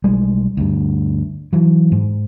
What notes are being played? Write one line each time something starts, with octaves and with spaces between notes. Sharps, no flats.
B1 G3 G#3
D2 G2
E3 F#3
G#2